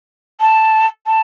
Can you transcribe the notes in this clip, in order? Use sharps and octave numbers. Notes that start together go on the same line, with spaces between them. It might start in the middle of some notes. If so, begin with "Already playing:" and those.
A5
A5